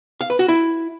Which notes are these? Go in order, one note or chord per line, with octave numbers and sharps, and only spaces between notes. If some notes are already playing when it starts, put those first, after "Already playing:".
F5
B4
F#4
E4